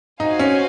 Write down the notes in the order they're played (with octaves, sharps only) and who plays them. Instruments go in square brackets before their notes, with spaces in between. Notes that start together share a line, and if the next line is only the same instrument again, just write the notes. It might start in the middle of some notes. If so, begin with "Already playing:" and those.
[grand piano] D#4 [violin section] F#4 C5 F5 G#5
[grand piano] C#4